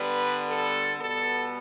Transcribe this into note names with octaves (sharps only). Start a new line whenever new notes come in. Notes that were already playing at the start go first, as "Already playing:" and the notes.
Already playing: D3 G3 B3 B4
A4
B2 G3 B3 A4